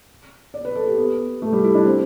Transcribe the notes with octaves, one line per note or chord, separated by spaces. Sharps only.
D5
B4
A4
G4
B3
A3
G3
E4
D4
C4